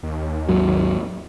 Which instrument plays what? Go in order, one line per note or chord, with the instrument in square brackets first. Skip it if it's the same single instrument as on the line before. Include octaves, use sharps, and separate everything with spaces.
[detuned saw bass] D#2
[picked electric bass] G#1 F#3